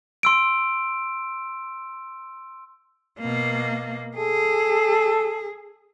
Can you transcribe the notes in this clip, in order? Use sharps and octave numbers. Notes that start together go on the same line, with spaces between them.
C6 E6 D7
B2 A#3
G#4 A4